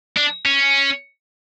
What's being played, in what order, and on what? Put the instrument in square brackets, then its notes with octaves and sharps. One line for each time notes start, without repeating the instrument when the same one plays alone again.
[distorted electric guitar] D4
C#4